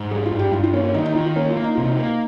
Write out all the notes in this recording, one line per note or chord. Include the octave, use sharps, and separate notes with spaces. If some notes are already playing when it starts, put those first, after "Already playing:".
Already playing: G#2
G3 G#4
F4
G2
G4
G2 F4
F4
A#3 C#4
C#4
D#3 D#4
D#4
D#3 F4
F4
A#3 C#4
F4
A#3
D#4
C3 F4
D#4
A#3